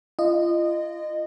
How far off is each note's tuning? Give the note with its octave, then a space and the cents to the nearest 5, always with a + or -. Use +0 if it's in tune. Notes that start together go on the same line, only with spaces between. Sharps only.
F4 -35 D#5 -20